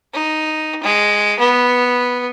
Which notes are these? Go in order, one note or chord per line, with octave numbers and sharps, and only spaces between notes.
D#4
G#3
B3